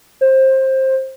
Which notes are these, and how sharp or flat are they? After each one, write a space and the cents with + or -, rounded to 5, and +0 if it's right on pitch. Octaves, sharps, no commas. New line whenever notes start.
C5 +20